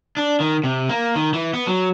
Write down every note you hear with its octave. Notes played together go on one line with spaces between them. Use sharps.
D4
D#3
C3
A#3
D#3
E3
B3
F#3